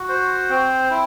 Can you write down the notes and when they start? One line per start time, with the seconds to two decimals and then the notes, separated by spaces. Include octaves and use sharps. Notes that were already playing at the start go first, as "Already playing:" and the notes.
Already playing: F#4
0.09 C5
0.50 C4
0.91 E4